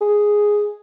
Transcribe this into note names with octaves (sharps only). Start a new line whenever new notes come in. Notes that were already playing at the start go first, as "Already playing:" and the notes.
G#4